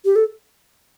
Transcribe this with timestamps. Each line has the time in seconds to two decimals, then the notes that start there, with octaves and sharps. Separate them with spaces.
0.05 G4
0.16 A4